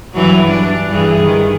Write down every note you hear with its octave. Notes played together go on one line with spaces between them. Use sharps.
G2 E3 F#3
D4
G2 E3 G#4
D#3